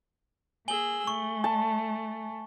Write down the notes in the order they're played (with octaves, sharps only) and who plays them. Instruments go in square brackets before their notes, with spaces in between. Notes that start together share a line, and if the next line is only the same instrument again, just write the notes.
[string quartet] A#3 G#4 E6 [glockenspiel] G#5 F#7 G7
[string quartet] A3 [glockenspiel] C#6
[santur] A5